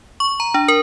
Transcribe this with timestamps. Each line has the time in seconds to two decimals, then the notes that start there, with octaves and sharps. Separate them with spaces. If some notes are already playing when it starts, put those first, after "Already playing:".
0.20 C#6
0.40 A#5
0.54 D4
0.68 A#4